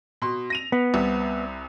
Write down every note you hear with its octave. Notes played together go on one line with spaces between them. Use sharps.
B2 C6
A#6 D#7 F7
B3
C2 C3